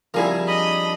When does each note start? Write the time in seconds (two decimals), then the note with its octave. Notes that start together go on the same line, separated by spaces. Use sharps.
0.14 F3 G3 C4 E4 G#4 A#4
0.48 D4 D#5 B5 D#6